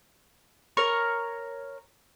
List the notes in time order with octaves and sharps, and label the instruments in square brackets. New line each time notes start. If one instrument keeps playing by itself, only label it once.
[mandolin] A#4 C#5 C#6